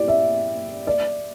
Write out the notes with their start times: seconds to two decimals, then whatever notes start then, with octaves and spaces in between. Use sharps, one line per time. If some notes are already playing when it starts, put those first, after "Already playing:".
Already playing: E4 G4 D5
0.08 E5
0.87 D5